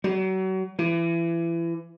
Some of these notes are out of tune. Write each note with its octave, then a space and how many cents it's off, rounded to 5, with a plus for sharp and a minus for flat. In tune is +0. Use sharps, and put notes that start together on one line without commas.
F#3 +35
E3 +30